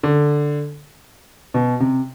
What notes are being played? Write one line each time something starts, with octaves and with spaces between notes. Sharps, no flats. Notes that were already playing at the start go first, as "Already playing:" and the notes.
D3
B2
C3